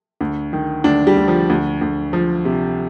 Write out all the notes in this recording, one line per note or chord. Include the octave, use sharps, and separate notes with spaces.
D2
D#3
D2 D4
G3
D2
F3
D2
D2
F3
C3